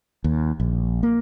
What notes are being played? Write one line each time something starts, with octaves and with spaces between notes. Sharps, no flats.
D#2
A#1
A#3